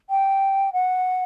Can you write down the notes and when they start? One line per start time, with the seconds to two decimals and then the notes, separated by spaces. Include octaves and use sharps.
0.10 G5
0.73 F#5